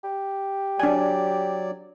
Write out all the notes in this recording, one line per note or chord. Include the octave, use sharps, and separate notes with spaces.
G4
F#3 D4 D5 G#5